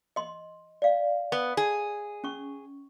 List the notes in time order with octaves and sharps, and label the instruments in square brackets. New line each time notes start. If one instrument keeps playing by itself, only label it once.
[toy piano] D#5 C6
D5 F5
[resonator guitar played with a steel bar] B3
G#4
[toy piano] C#4 C#6